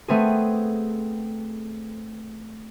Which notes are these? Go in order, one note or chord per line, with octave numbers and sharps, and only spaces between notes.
A3 B3 C4 G#4